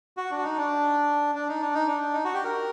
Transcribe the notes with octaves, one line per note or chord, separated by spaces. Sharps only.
F#4
D4
F#4
D#4
D4
D4
D#4
D4
D#4
D4
D#4
F#4
G4
A#4